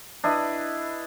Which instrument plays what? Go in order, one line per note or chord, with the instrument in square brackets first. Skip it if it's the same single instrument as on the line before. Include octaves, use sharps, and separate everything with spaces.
[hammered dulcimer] D4 E4 B4 D#5